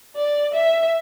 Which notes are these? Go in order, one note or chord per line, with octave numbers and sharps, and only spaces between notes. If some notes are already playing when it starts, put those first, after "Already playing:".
D5
E5